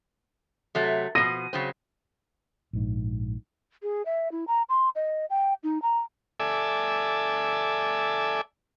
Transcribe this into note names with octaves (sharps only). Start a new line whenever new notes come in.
C3 F#3 A3
B2 F3 A#6 D#7
C#3 F#3 C4
A#1 G#2
G#4
E5
E4
A#5
C6
D#5
G5
D#4
A#5
A4 D5 E5 G#5